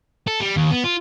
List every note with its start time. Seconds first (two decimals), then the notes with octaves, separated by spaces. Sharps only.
0.28 A4
0.41 G3
0.57 D#2
0.71 B3
0.84 F4